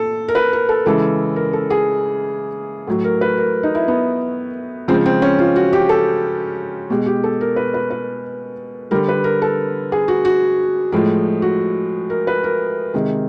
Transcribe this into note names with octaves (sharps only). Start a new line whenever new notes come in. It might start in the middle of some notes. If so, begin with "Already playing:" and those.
Already playing: A#2 A4
A#4
B4
A#4
A4
C#3 E3 G#3 A4
A#4
A4
G#4
A2 F#3
A#4
B4
A#4
D#4
E4
B3
C#3 F3 G#3 C4
C4
C#4
F4
F#4
G4
A4
B2 G#3 G4
G4
A4
A#4
B4
B4
B4
D3 G3 A#4
B4
A#4
A4
G#4
F#4
F#4
A2 F3 G#3
F#4
A#4
B4
A#4
C3 D#3 G#3